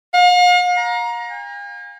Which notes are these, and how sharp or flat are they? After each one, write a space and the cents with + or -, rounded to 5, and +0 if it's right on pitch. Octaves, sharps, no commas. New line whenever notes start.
F5 +40
A#5 +20
G#5 -45